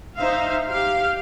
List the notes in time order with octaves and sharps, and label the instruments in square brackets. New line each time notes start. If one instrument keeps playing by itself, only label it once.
[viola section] D#4 C5 E5 F5
G4 F5